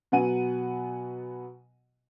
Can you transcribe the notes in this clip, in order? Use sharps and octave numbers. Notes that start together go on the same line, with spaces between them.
B2 F#3 B3 F#5 G#5 D#7